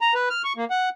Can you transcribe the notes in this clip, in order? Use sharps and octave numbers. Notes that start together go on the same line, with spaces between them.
A#5
B4
F6
C#6
A#3
F#5